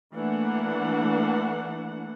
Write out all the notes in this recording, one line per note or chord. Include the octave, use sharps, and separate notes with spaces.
E3 A3 A#3 D4 F#5